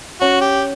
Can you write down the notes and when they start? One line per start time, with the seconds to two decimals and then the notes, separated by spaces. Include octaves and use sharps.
0.21 C#4 F#4
0.41 G4